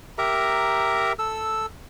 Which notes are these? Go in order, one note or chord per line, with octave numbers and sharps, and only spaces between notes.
G4 A#4 E5 A#5
A4 E6